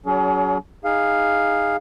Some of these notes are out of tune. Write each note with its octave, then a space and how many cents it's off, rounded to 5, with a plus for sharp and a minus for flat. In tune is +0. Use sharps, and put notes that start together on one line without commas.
F#3 +20 C#4 +45 G#4 +25
D#4 +5 G#4 -20 F5 +0